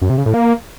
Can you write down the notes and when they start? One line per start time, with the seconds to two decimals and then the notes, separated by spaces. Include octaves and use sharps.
0.01 F#2
0.10 C3
0.18 C#3
0.26 A2
0.34 A#3